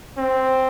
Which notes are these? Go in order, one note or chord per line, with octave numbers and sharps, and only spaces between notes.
C4